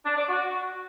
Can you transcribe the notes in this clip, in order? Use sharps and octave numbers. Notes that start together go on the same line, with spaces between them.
D4
D5
F#4